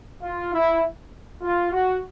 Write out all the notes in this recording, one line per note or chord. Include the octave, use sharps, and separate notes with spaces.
F4
E4
F4
F#4